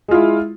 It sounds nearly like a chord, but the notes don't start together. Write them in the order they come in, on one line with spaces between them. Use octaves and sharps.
G#3 F4 E4